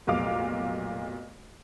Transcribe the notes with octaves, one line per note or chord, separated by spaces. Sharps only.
F1 B1 A#2 F5 D6